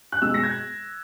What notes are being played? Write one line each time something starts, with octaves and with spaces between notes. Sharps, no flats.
F#6
B2 G#3 E6
A#6
G#6